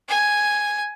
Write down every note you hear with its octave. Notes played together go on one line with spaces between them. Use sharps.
G#5